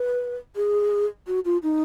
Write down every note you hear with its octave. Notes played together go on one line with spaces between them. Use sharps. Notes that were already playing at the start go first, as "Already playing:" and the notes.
Already playing: B4
G#4
F#4
F4
D#4